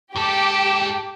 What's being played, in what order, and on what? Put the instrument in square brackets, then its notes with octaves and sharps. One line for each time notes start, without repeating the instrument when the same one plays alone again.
[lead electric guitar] G#2 A4 [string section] G4